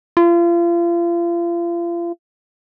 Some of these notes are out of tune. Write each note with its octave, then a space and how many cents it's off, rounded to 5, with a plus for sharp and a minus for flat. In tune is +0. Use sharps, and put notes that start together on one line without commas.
F4 -35